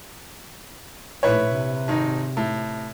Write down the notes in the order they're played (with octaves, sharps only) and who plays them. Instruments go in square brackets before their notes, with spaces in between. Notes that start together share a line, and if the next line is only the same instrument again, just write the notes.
[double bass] A#1 A2 [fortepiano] E4 B4 C#5
[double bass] C3
[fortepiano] G#1 D#4
A2